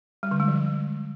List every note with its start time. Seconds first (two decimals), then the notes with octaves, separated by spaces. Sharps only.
0.23 G3
0.31 D3
0.40 G#3
0.48 F3